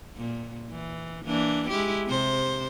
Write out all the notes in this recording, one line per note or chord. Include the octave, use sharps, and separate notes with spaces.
A#2
E3
E3 A#3 D4
G#3 E4 G4
C3 C5